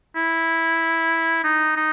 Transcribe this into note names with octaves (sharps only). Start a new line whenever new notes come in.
E4
D#4
D#4